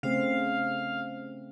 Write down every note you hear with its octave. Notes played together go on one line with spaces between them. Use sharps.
C#3 A3 C4 F5